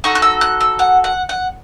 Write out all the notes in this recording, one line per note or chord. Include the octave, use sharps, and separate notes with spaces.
D#4 F#4 A4 C#6
F#6
E6
F#6
E6
F#5
F#5
F#5